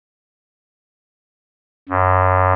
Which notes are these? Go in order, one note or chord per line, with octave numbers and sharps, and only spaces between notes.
F#2